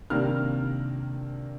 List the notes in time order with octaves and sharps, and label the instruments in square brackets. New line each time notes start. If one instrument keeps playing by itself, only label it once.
[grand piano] C3 D#3 A#3 D4 F6